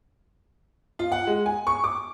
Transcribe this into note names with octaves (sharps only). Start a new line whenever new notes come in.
F4
F#5
G#3
G#5
C#6
D6